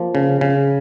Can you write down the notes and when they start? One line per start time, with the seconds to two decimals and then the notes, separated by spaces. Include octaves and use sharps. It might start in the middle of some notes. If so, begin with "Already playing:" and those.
Already playing: F3 A#3
0.15 C#3
0.41 C#3